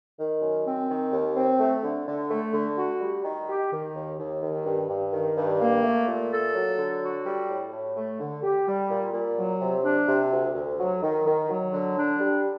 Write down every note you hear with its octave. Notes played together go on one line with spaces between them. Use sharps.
D#3
F#2
C4
D#3
D#2
C4
A3
D3
D3
A3
D3
F#4
G3
D#3
G4
D#3
D#2
D#2
D#3
G2
G2
D#3
G2
A#3
A3
A#2
A4
F#3
D3
F#4
G3
A2
A2
A3
D3
G4
G3
A#2
A#2
F#3
C3
D4
C3
D2
D2
F#3
D#3
D#3
F#3
D3
D4
G3